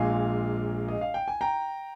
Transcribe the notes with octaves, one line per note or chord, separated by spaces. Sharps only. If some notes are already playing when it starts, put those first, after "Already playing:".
Already playing: A#1 A#2 G#3 F5 G#5
D#5
F5
G5
G#5
G5 A#5